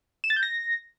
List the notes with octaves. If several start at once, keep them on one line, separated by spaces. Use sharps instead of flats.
E7
A6
G6
A#6